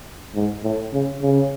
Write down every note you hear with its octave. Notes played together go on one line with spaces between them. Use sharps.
G#2
A2
C#3
C#3